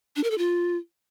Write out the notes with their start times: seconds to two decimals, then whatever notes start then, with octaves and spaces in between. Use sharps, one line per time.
0.16 D4
0.24 A#4
0.31 A4
0.38 F4